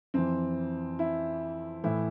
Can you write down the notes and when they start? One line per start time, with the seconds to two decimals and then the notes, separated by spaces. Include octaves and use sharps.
0.14 F2 E3 C4
0.99 E4
1.84 A2 E3 E4